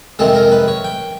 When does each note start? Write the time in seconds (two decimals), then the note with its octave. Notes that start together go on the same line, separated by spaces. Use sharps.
0.19 F2 C3 D#3 G#3 A4
0.35 A#4
0.52 B4
0.68 C#5
0.84 G5